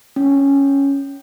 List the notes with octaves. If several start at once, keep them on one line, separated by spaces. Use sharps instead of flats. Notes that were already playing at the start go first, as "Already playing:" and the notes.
C#4